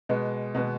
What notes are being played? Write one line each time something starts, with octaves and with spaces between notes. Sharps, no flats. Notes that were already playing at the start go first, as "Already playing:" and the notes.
B2 G#3 B3
B2 G#3 B3